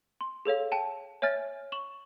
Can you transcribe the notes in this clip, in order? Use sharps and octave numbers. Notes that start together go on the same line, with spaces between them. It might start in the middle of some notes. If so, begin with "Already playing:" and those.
C6
G#4 A4 C#5 F5
G5 A5 E7
C#5 E5 G#5 F6 A6
C#6 E7 F#7